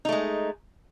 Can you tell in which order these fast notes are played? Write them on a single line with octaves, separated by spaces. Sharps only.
D#4 A3 G#3